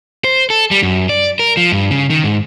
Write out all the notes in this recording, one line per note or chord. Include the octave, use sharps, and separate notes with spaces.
C5
A4
G3
F#2
D5
A#4
F3
G2
C#3
D#3
G#2